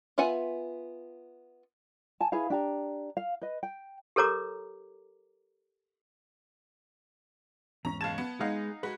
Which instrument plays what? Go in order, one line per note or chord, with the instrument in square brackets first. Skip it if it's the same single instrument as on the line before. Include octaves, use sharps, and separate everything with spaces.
[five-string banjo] B3 F4 E5 F#5 G#5
[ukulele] G#5 A5
E4 G#4 B4 F5
D4 G4 A#5
F5
B4 D#5
G5
[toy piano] G4 A4 A#4 C#5 A#5 D6
[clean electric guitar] E2 G#2 C#4 [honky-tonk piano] A#5
[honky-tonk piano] F#1 G#6 E7 [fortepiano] F5 A5
[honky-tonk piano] B3
[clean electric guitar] G#3 G#4 [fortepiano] D#4 F5 F#5
[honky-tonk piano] G#3 F#4 [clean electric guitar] G#4 B4